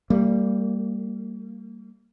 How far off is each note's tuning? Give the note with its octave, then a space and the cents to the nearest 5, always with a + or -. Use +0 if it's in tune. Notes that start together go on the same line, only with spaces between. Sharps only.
G3 +0 A#3 -30